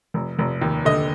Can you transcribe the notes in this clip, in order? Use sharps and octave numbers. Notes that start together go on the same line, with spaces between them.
F1
F1
D#2
D3 D#5